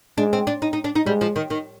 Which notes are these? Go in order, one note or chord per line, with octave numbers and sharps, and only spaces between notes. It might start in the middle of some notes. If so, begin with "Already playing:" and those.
G#3 D4
C4
D4
D#4
D#4
D4
D#4
G3 G#3
F3
D#3
D#3